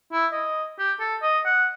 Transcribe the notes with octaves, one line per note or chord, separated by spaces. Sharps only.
E4
D#5
G4
A4
D#5
F#5